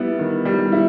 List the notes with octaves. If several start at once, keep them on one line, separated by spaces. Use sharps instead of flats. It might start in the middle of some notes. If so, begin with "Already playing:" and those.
Already playing: G3 B3 E4
D#3
G3
E4